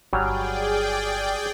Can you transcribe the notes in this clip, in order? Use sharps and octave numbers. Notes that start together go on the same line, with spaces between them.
G1 F#3 G3 G#4 D5 G5 G#5 F6